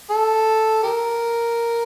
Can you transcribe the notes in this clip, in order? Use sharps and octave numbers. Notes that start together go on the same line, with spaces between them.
A4
G4 A#4